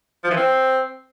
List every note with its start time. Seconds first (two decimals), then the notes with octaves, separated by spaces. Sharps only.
0.24 F3
0.31 E3
0.37 C4